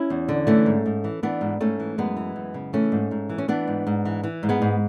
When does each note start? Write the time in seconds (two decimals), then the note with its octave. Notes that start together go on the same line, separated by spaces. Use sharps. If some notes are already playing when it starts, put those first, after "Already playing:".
Already playing: C#4 E4
0.10 E2
0.29 D3
0.47 E3 A3 C#4
0.66 G#2
0.86 G#2
1.04 E3
1.23 E3 B3 D4
1.41 G#2
1.61 G#2 A3 C#4
1.80 E3
1.98 F#2 G#3 B3
2.17 E3
2.36 F#2
2.54 C#3
2.73 E3 A3 C#4
2.92 G#2
3.11 G#2
3.30 E3
3.38 C#4
3.48 E3 B3 D4
3.67 G#2
3.87 G#2
4.05 E3
4.24 E3
4.43 G#2
4.49 G#3 B3
4.62 G#2